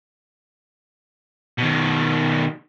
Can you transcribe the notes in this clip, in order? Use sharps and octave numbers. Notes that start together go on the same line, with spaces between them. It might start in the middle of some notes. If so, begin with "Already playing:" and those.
B2 D#3